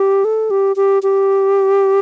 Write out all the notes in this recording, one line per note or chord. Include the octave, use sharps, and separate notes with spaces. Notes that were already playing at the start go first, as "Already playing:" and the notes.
Already playing: G4
A4
G4
G4
G4